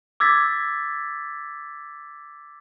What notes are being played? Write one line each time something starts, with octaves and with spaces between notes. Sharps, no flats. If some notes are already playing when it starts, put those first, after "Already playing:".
D6 E6 G#6 A6 B6